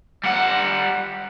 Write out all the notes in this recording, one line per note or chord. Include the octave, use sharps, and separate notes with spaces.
G3 F#5